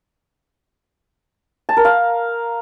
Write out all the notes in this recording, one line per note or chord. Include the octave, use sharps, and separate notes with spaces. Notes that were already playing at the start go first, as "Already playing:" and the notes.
A5
A#4
F5